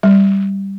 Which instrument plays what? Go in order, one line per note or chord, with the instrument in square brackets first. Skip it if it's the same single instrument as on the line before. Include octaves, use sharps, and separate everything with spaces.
[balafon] G3